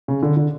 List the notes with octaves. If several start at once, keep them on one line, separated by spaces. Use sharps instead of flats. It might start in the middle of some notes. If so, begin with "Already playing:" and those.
C#3
D3
D3